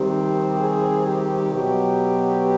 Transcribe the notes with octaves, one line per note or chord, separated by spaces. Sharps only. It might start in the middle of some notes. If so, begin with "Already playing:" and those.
Already playing: C3 D#3 G3 C4 G4
G#4
G4
B2 F#3 B3 G4